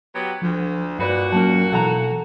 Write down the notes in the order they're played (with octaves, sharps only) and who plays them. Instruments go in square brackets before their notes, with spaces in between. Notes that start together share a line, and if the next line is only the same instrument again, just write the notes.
[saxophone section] F#3 B3 G4
[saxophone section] D2 [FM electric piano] F3
[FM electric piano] G2 [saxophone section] A#2 F#4 [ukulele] D#4 B4 D5
[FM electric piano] F#3 A#3 C#4 [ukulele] A#4 A5
[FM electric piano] B2 E3 [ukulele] A4 F#5 A#5